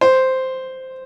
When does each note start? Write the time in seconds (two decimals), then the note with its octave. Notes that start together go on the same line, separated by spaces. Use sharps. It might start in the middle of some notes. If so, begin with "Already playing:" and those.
0.01 C5